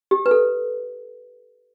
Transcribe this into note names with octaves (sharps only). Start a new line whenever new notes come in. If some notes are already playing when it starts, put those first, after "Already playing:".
G4
B4
A4